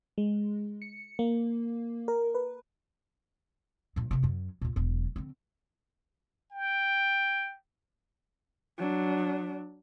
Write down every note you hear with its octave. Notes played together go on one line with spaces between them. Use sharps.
G#3
C#7
A#3
A#4
B4
G2 A#2
C3 D#3
F#2 F#3
D#2 A#2
E1 F#3
D3 C4
G5
F#3 D4